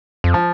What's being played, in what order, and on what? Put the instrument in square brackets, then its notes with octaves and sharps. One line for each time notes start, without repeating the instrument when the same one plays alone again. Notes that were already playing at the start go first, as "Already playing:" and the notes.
[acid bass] F2
[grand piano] F3